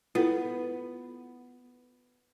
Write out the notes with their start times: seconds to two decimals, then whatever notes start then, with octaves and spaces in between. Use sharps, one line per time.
0.15 B3 E4 F4 A4